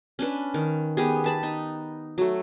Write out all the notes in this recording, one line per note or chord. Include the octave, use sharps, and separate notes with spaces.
C#4 D4 B4
D#3
B3 G4 G#4
B4 A5 B5
D#4
F#3 A3